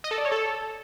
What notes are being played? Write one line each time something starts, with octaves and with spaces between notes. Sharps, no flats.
D#5
A4
D5
C#5
A4